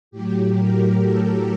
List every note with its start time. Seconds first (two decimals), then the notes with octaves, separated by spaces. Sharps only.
0.11 A2 F#3 G4
0.55 A#4
0.98 A4